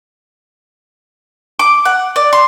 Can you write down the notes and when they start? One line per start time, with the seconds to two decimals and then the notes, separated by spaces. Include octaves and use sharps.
1.59 D6
1.85 F#5
2.16 D5
2.33 C6